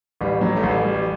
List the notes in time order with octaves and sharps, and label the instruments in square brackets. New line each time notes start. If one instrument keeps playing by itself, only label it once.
[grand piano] A1 [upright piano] G3
[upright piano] F#3
A3
[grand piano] A1 [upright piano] G3
[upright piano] G3